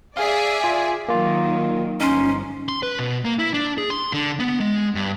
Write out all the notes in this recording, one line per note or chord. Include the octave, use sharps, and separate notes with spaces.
G#4 D5 E5 F5
F4 G#5
D#3 F#3 A#3 F4
G1 F3 C#4 D#4 C6
C6
B4
B2
A#3
E4
D4
G#4
C6
D3
B3
G#3
G2